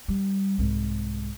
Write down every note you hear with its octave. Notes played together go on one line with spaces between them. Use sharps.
G3
C2 G#2